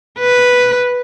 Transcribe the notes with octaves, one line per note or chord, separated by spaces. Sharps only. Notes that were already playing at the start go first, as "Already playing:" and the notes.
B4